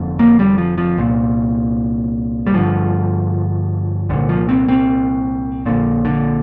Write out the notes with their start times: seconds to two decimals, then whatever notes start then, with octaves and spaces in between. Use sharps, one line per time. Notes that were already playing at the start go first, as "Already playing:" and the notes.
Already playing: F1 F2 D3
0.19 A#3
0.39 G3
0.58 F3
0.78 F3
0.97 C2 A#2
2.47 G3
2.54 G1 G2 D3 F3
4.09 C2 A#2 D3
4.29 F3
4.49 C4
4.68 C4
5.66 A#1 A#2 D3
6.05 D3